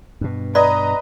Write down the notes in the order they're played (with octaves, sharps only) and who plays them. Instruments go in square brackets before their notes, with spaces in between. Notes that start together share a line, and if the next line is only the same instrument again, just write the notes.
[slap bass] G2 B2
[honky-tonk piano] B4 D#5 [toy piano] D5 [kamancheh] A#5